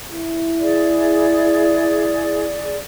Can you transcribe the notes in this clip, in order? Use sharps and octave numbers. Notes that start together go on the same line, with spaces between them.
E4
G#4 D5